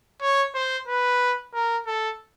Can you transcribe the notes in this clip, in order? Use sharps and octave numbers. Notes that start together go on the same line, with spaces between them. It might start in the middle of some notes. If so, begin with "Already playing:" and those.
C#5
C5
B4
A#4
A4